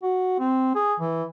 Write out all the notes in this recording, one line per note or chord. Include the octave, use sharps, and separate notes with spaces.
F#4
C4
G#4
E3